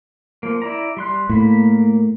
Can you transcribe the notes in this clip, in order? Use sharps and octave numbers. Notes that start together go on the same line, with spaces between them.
F3 A#3
E4 D5 A#5
G3 C6 F#6
A2 A#3 B5